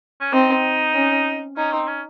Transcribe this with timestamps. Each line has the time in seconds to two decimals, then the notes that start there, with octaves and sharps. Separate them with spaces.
0.21 C#4
0.33 C4 D#4
0.94 C#4
1.56 C#4 D#4
1.72 C4
1.87 C#4